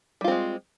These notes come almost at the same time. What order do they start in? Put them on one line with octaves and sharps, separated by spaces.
G3 F4 C4 G#3